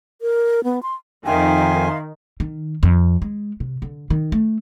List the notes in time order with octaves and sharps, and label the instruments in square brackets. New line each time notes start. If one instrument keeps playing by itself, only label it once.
[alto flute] A#4
B3
C6
[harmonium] F2 G#5 [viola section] D#3 [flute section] E5 F5 C6 [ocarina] G5
[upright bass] D#3
F2
G#3
C3
D3
D#3
A3